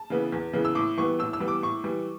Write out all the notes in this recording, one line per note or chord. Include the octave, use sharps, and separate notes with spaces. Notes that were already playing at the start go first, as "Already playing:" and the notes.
Already playing: A5
C#3 E3 B3
E2
C#3 E3 B3
E6
A2 D6
E3 G3 B3 C#6
A2 E6
E6
E3 G3 B3
D6
A2 C#6
E3 G3